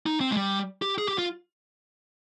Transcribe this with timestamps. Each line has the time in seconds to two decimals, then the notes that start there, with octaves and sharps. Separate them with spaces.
0.06 D#4
0.20 C4
0.31 G#3
0.37 G3
0.82 G4
0.98 G#4
1.08 G4
1.18 F4